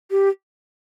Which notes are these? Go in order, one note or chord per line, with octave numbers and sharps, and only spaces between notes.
G4